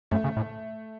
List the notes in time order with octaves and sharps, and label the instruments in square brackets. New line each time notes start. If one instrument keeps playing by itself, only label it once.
[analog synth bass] F#2 [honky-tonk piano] A3
[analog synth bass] C#3
A2